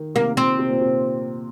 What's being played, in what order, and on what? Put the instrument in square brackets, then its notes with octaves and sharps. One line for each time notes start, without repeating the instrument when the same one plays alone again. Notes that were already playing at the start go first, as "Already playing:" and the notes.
Already playing: [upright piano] D#3
[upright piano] C3 [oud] A#3
[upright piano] A#2 [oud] C4
[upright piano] C3
A#2
C3